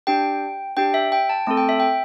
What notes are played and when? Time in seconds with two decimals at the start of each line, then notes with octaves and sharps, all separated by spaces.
0.07 D4 G4 G5
0.77 D4 G4 G5
0.94 E5
1.12 G5
1.29 A5
1.47 A3 C4 A4 A5
1.57 G5
1.69 E5
1.80 G5